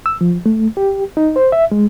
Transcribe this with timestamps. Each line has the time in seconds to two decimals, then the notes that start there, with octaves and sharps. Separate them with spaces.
0.06 E6
0.21 F3
0.46 A3
0.77 G4
1.17 D#4
1.36 C5
1.52 E5
1.72 G#3